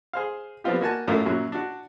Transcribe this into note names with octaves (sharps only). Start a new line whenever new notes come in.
G#4 C5 F5
F3 G3 B3 C4 F4 G4
A#3 F#4 G#5 A5
F#2 A2 A3 F4 A#4
F#2 A#2 F#3
D4 F#4